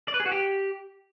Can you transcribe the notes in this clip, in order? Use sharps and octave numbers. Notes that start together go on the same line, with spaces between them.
D5
B4
G#4
F#4
G4